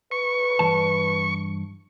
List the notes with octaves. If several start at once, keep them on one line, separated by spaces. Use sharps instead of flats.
B4 C#6
G2 E3 A5